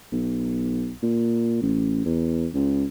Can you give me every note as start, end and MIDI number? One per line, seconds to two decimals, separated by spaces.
0.12 0.94 35
1.02 1.59 46
1.62 2.00 33
2.05 2.48 40
2.54 2.85 37